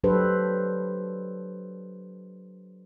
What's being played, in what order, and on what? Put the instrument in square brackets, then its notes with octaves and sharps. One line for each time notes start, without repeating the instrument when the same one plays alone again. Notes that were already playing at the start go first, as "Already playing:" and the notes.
[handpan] F#3 D4 G4 A4 B4 C5